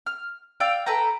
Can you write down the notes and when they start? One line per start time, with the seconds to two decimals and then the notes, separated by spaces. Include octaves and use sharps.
0.06 F6
0.60 D5 F5 G5 E6
0.86 A4 B4 G5 A#5